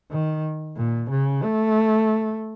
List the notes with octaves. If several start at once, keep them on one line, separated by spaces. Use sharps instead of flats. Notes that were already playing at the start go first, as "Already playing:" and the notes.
D#3
A#2
C#3
A3